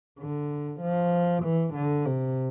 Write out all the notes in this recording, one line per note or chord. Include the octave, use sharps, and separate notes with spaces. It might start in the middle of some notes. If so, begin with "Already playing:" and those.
D3
F3
E3
D3
C3